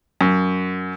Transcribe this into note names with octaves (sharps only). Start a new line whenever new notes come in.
F#2